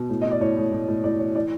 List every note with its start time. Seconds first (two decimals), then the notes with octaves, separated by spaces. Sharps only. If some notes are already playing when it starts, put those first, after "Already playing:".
Already playing: B2
0.09 A2
0.21 E3 D#5
0.31 D5
0.41 A2 C#5
0.57 A2
0.72 A2
0.88 A2
1.04 A2 D5
1.19 E3 C#5
1.35 E3 D5